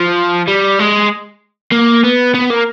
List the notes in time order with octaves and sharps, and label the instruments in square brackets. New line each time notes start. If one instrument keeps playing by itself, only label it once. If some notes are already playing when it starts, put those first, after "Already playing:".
Already playing: [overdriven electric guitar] F3
G3
G#3
A#3
B3
B3
A#3